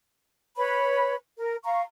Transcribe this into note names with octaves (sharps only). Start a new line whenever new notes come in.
B4 C#5 B5
A#4
F5 A#5 C#6